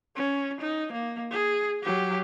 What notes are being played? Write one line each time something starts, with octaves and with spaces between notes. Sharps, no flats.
C#4
D#4
A#3
G#4
F#3 G4